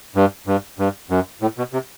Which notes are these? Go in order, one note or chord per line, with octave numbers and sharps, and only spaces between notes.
G2
G2
G2
F#2
A2
B2
C3